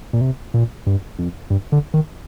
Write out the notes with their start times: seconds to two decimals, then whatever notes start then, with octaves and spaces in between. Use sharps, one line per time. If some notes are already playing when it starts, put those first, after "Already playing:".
0.13 A#2
0.21 C3
0.54 A#2
0.86 G2
1.19 F2
1.50 G2
1.72 D3
1.94 D#3